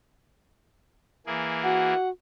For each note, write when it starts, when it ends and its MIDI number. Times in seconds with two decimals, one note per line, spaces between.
1.27 1.94 52
1.27 1.94 58
1.27 1.94 68
1.63 2.10 66
1.63 2.09 78